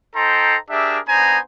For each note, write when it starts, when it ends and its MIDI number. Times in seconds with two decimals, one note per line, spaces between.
0.16 0.57 63
0.16 0.57 69
0.16 0.57 72
0.16 0.57 79
0.16 0.57 82
0.16 0.57 84
0.70 0.99 62
0.70 0.99 67
0.70 0.99 68
0.70 0.99 70
0.70 0.99 76
1.08 1.39 59
1.08 1.39 62
1.08 1.39 63
1.08 1.39 72
1.08 1.39 80
1.08 1.39 82